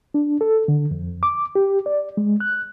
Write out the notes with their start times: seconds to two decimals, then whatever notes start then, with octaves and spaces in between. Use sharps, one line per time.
0.14 D4
0.41 A4
0.68 D3
0.91 F2
1.23 D6
1.55 G4
1.86 D5
2.17 G#3
2.40 F#6